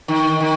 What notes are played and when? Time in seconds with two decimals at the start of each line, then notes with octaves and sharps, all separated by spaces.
0.08 D#3
0.40 D#3